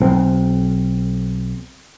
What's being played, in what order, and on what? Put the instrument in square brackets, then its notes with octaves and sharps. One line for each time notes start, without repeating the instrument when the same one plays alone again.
[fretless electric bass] B1 C4